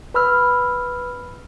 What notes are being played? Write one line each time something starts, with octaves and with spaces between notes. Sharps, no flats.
B4 B5 E6 F6